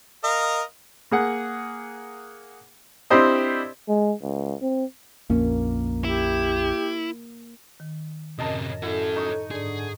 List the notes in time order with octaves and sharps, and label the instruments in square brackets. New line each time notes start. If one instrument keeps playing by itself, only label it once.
[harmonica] A#4 D#5 F5
[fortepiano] A#3 G#4 F#5
C4 D4 E4 G4 C5 D#5
[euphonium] G#3
C#2
C4
[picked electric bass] A#1 F2 C#4 [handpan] A#3
[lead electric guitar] E4 [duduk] G4
[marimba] D#3
[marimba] F#2 A2 A#4 [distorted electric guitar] C3 C#4 [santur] D#5 A5 A#5
[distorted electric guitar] C#4 F#4 [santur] E4 [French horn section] A4
[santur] D#4 C#6 D#6
[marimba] G#2 [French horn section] D3 [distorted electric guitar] G#4